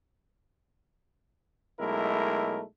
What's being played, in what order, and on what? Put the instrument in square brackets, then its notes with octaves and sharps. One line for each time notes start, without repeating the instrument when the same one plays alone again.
[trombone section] B1 G#3 A3 E4 A#4